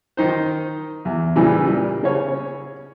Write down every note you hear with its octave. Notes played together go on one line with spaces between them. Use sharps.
D#3 D#4 C5
E2
A#2 C#3 E3 G3
A#2 G3
C#3 C#4 C#5